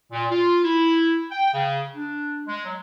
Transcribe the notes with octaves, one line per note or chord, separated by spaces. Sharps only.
A#2
F4
E4
G5
C#3
D4
G#3
F#3